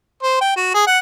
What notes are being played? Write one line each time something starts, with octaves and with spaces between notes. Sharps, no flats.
C5
G5
F#4
G#4
F#5